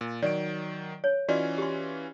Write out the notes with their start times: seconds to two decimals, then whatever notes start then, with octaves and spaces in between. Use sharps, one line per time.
0.01 A#2
0.22 D#3 F#3 D5 D7
1.04 C#5
1.28 E3 C#4 F4 F#4 D5 D#5
1.58 G4 C6